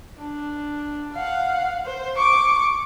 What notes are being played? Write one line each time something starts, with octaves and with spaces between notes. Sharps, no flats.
D4
F5 F#5
C5
C#6 D6